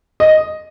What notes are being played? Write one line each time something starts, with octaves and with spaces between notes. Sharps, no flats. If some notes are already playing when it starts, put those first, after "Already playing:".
D#5